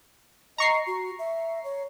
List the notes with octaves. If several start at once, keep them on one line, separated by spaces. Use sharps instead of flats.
D#5 A#5 C#6 C7
F#4
E5
C#5